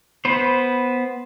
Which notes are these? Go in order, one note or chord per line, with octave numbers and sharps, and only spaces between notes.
B3 B4 C5